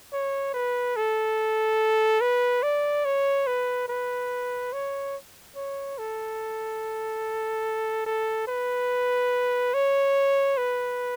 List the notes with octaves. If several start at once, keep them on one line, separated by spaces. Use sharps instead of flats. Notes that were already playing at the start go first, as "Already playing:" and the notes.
C#5
B4
A4
B4
D5
C#5
B4
B4
C#5
C#5
A4
A4
B4
C#5
B4